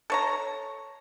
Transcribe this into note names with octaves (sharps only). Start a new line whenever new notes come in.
A4 C#5 A#5